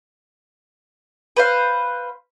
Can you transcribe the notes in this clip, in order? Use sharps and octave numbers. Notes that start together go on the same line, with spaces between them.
B4 C5 F5